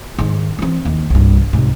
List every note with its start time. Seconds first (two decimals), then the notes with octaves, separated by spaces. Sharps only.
0.19 G#2 D#3
0.59 E3 C4
0.85 D#2
1.10 C2 G2
1.53 G#2 C3